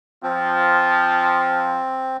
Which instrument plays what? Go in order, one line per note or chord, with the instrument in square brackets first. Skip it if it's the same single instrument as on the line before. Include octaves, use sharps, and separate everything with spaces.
[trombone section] F3 [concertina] C4